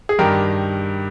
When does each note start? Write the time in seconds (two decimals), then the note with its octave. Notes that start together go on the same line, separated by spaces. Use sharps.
0.09 G#4
0.19 G2 D#3 G4 A#4